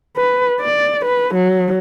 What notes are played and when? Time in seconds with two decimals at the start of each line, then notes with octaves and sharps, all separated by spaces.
0.16 B4
0.61 D5
1.05 B4
1.34 F#3